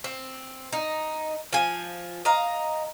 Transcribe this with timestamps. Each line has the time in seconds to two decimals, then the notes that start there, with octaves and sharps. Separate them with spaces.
0.04 C4
0.73 D#4
1.53 F3 G#5
2.25 D#5 F5 A#5